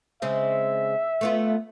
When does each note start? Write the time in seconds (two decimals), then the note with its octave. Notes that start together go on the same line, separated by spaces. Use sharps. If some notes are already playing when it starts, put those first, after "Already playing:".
0.22 C#3 G#3 C4 E5
1.21 A3 B3 F4